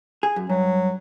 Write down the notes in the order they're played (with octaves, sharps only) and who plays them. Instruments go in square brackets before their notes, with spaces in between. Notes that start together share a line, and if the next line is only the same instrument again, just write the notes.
[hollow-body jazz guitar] G#4
F#2
[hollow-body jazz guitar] G2 [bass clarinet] F#3